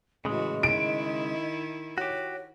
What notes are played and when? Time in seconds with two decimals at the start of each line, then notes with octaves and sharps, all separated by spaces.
0.25 A2 C#3 E3 G#3 F#4 D#5
0.63 D#3 E4 D7
1.98 F#4 G4 C#5